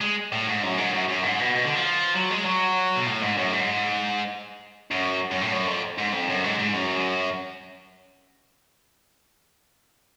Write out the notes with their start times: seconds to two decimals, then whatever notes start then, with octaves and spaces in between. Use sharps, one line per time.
0.01 G#3
0.32 A2
0.47 G#2
0.63 F#2
0.78 G#2
0.93 F#2
1.08 F#2
1.23 G#2
1.39 B2
1.55 B2
1.64 D3
1.75 F3
2.16 F#3
2.31 G#3
2.45 F#3
2.96 B2
3.07 A2
3.22 G#2
3.38 F#2
3.53 G#2
4.91 F#2
5.31 F#2
5.41 A2
5.52 F#2
5.67 F2
5.98 G#2
6.12 F2
6.29 F#2
6.44 G#2
6.59 G#2
6.73 F#2